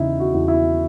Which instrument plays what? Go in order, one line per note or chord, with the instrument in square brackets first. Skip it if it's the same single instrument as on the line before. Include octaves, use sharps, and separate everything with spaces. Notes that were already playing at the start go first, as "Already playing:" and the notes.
Already playing: [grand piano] E2 C#3 E3 D#4 E4
F#4
E2
E4